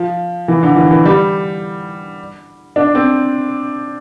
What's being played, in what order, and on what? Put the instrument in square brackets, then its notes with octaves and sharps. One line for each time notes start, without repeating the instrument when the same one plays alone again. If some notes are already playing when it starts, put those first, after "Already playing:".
Already playing: [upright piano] F3
E3
D3
E3
E3
G3
D4
C4